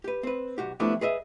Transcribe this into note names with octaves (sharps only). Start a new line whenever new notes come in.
G4 B4
C4 B4
B1 F#4 G4
F3 A3 B3 D4 E4 G4
G#4 B4 D#5 E5